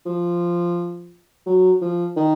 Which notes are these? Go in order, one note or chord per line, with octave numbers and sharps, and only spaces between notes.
F3
F#3
F3
D#3